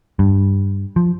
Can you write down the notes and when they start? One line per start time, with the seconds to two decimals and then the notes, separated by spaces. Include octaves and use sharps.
0.19 G2
0.96 F3